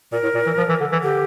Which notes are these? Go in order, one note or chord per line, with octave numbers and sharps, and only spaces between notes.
A#2 A#4
A2
A#2
E3
F3
E3
D3
E3
D3 G4